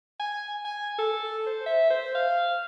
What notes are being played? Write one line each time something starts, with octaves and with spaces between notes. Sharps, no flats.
G#5
G#5
A4
C5
E5
C5
F5